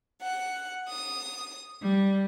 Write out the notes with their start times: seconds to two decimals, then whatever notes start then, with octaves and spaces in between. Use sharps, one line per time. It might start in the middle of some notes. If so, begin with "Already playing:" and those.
0.21 F#5
0.88 D#6
1.82 G3